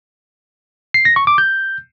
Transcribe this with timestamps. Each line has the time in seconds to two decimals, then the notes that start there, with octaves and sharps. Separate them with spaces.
0.94 C7
1.05 A#6
1.16 C#6
1.27 D6
1.38 G6